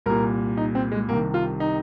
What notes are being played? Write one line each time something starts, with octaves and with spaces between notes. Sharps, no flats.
C2 A#2 A#4
D#4
C4
G#3
C2 C3 D#3 A#3
F4
D#4